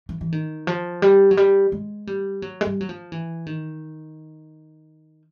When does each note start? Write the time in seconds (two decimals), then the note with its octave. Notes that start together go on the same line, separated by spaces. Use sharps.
0.09 E3
0.21 E3
0.32 D#3
0.67 F3
1.02 G3
1.31 F#3
1.37 G3
1.72 G#3
2.07 G3
2.42 F#3
2.61 G#3
2.65 G3
2.81 F#3
2.89 F3
3.12 E3
3.46 D#3